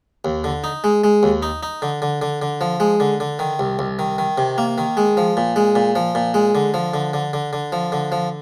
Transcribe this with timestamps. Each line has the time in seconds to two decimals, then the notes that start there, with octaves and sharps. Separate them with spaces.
0.25 D#2
0.44 D3
0.64 D#4
0.84 G#3
1.04 G#3
1.23 D#2
1.43 D#4
1.63 D#4
1.82 D3
2.02 D3
2.22 D3
2.42 D3
2.61 F3
2.80 G#3
3.00 D3
3.20 D3
3.39 D#3
3.59 C2
3.79 C2
3.99 D#3
4.18 D#3
4.38 C3
4.58 A#3
4.78 D#3
4.97 G#3
5.17 F3
5.37 A#2
5.56 G#3
5.75 A#2
5.96 F3
6.15 A#2
6.34 G#3
6.55 D3
6.74 F3
6.94 D3
7.14 D3
7.33 D3
7.53 D3
7.72 F3
7.92 D3
8.12 F3